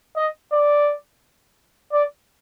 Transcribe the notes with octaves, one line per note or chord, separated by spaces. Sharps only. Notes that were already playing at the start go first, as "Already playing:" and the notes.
D#5
D5
D5